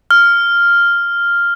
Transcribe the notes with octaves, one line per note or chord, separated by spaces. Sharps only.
F6